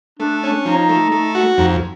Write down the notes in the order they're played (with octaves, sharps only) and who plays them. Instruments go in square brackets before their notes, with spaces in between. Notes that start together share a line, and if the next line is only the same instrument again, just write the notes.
[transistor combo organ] A3 [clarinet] D4
[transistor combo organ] C#4 [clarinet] D4
[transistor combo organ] F3 [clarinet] D#4
[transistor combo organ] A3
A3
F#4
[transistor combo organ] F2 [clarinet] D#4